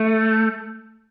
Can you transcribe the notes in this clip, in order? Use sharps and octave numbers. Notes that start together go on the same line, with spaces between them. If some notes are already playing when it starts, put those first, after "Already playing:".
Already playing: A3